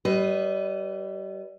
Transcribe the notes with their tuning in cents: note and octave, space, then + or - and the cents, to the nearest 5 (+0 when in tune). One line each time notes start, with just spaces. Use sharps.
G3 -35 B4 +5 D#5 +0